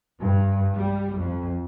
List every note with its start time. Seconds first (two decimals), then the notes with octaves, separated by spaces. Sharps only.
0.20 G2
0.75 G3
1.18 F2